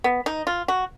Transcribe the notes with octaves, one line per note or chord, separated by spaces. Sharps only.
B3
D#4
F4
F#4